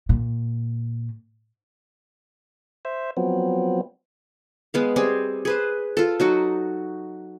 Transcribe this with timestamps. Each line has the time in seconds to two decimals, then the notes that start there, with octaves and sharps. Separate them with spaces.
0.09 A#2
2.85 C5 E5
3.17 F3 F#3 B3 C4
4.74 G#3 B3 F5
4.96 G3 C4 G#4
5.45 G#4 B4 C5
5.97 F4 A4
6.20 F#3 D#4 F#4